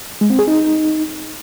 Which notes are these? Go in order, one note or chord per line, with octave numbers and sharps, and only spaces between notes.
G#3
C4
G#4
D#4